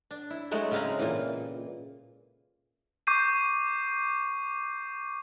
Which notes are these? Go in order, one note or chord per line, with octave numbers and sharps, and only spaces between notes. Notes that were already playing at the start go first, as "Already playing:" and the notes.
D4
E4
F#3 G#3 A3 E4 F#4
C#3 G#3 C4 F5 G#5 A#5
A#2 E3
C#6 D6 G6 C7 D#7